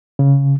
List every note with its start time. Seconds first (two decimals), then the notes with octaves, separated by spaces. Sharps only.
0.19 C#3